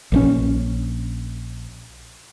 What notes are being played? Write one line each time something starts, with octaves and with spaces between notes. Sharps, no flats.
A#1 E3 C#4